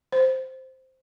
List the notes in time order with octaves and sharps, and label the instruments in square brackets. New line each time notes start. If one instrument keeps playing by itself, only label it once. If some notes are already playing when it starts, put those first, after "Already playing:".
[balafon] C5